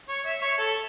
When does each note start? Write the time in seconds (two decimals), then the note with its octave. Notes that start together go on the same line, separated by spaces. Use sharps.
0.09 C#5
0.26 E5
0.42 C#5
0.58 A4